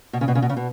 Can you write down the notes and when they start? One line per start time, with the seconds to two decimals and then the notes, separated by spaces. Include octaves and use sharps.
0.13 B2
0.21 C#3
0.28 B2
0.35 C#3
0.42 B2
0.49 C#3
0.57 B2